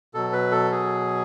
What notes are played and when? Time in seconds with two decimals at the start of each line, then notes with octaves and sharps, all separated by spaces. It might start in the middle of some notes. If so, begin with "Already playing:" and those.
0.14 B2 F#3 A4
0.33 B4
0.52 A4
0.72 G#4